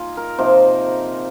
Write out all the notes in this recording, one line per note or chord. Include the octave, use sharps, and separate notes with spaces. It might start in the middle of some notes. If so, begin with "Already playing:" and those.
Already playing: A#3 D#4 F4 G#4
A#4
C3 F3 A#3 D#4 C5